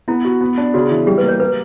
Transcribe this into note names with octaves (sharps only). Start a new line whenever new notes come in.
B3 E4
F#4
B3
D4
C#3 F#4
E3
G3 G4
B4
A#3
C#5
A#3 B4